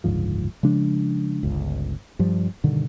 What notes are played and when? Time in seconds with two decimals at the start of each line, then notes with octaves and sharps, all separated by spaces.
0.04 F#1 D2 G#2 F3
0.63 C#3 F3 G#3 D4
1.43 G1 C#2
2.19 G2 F3 G3
2.64 G2 B2 D3 D#3